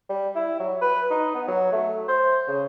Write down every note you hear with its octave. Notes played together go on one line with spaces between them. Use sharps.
G3
E4
F#3
B4
D#4
B3
F#3
A3
C5
C#3